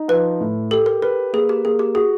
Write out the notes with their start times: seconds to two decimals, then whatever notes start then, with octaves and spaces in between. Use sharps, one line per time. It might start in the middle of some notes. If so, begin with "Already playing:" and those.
Already playing: D#4
0.08 F3 B4
0.40 A2
0.71 G4 A4
0.86 A#4
1.02 A#4 B4
1.33 A#3 G#4
1.49 G4
1.65 A#3 G#4
1.79 G4
1.95 F#4 G#4